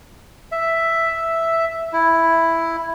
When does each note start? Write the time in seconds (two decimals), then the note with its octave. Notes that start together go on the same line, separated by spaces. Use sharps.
0.52 E5
1.93 E4